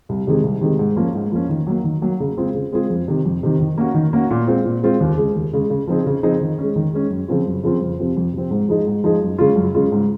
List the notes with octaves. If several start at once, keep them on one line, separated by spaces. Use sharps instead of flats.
C2
C3 D#3 G#3
C2
C3 D#3 G#3
G#2
F3 A#3 C#4
G#2
F3 A#3 C#4
D#3
F#3 A#3
D#3
F#3 A#3
C#3
G#3 C4 F4 G#4
C#3
G#3 C4 F4 G#4
F2
C3 D#3
F2
C3 D#3
D#3
A#3 C#4 F#4
D#3
A#3 C#4 F#4
A#2
G#3 C4 F4
A#2
G#3 C4 F4
D#2
C#3 G#3
D#2
C#3 G#3
C#3
F3 C4 D#4 G#4
C#3
F3 C4 D#4 G#4
D#3
G#3 C#4
D#3
G#3 C#4
F#2
C#3 F3 C4 F4
F#2
C#3 F3 C4 F4
F2
C3 F3 C4
F2
C3 F3 C4
G#2
F3 G#3 D#4 G#4
G#2
F3 G#3 D#4 G#4
F#2
C#3 G#3 C#4 F4
F#2
C#3 G#3 C#4 F4
G#2